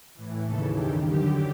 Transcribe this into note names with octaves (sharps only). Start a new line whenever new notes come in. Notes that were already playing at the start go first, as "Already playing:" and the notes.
A2 E3
D#2 C#3 E3 A4
G2 D#3 G4
F#2 D3 G4